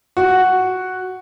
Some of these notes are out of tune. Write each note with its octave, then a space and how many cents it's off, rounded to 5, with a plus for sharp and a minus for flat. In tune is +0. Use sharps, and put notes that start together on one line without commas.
F#4 +0 F#5 +0